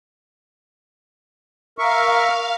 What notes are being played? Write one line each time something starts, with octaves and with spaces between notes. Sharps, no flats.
A#4 E5 F5 C#6